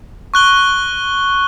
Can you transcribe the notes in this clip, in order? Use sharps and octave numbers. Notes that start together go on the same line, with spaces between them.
C#6 F#6 G7